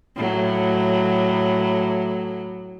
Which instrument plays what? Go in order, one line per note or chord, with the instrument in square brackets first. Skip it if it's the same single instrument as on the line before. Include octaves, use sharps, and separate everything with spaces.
[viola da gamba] A2 F#3